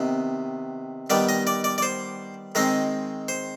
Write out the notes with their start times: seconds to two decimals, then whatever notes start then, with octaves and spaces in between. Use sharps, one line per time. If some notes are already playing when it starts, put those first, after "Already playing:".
Already playing: C3 D#3 B3
1.10 D#3 G3 B3 D5
1.29 D#5
1.47 D5
1.64 D5
1.78 D5
1.82 C5
2.55 D#3 G#3 C4 D#5
3.28 C5